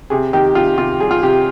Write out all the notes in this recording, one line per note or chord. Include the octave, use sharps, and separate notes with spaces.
C3 G#4
D#3 G4
C3 F4
C3 F4
G3 G#4
F4
C3 G4